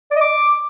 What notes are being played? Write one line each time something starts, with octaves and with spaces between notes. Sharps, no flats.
D5
D#5
D6